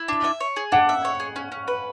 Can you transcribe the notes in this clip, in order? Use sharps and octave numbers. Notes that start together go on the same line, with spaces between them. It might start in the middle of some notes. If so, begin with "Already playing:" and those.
Already playing: E4
D4
E5
C#5
G#4
D4 F#5
E5
C#5
G#4
C#4
C#4
B4